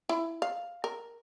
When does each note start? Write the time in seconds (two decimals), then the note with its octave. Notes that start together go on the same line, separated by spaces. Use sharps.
0.09 E4
0.42 F5
0.84 A#4